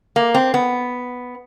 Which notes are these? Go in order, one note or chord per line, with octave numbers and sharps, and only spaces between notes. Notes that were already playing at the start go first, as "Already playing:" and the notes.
A#3
C4
B3